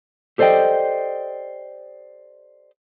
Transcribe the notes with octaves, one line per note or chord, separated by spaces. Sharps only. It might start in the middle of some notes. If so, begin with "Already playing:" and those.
G4 A4 C5 D5 D#5 G5